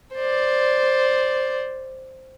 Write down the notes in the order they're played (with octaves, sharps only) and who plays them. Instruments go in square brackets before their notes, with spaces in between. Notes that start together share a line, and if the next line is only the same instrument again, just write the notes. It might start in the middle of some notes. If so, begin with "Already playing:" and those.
[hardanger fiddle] C5 D5